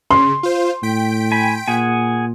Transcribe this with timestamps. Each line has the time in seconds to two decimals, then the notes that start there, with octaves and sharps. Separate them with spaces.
0.11 C#3 C6
0.43 F4 C5
0.83 A2 G5 B6 D7
1.32 G#5 B5
1.68 A#2 G#4 F#5 G#5